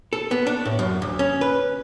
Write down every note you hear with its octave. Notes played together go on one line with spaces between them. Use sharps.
A4
B3
D4
A2
F#2
D2
C#4
B4